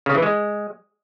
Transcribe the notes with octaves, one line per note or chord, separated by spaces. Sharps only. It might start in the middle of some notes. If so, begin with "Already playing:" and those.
C#3
E3
G#3